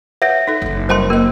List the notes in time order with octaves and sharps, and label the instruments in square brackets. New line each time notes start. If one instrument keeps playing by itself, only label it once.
[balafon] B4 F#5 [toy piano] C#5 E5
[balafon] D#4 A4
[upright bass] F#1 C4
[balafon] G3 A#4 D#5 [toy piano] C5 A5 C6
[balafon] A#3 D#5 [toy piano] A#4